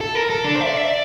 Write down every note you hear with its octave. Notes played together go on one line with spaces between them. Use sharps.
A4
A#4
A4
D4
C5
E5
D5
E5
D5